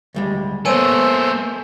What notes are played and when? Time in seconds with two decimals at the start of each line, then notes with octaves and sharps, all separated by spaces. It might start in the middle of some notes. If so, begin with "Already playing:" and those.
0.14 D2 G3 G#3
0.65 A#3 B3 A4 C5 C#5 G#5 E6 D#7